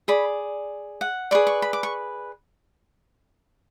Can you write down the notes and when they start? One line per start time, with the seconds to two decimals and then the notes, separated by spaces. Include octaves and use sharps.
0.08 G#4 D5 B5
1.01 F#5
1.31 G#4 B4 D5 C#6
1.47 C#6
1.62 B5
1.73 D6
1.83 C#6